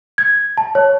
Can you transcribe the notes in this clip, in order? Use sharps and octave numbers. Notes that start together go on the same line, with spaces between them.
G#6
A5
C#5